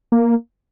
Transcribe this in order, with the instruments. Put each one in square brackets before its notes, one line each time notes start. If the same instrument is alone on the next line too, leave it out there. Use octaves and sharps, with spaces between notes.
[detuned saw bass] A#3